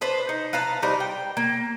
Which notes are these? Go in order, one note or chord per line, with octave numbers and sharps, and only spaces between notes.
D4 B4 C5
D#4
B4 F5 A5 A#5
G3 D#4 A#4 C5
G5
A#3